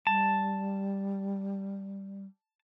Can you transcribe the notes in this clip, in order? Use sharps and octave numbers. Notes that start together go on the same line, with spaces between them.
G3 A5